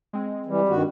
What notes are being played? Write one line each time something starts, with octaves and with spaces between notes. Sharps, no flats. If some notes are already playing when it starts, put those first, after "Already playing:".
G#3 C4
E3 G3
G2 D#3 F#4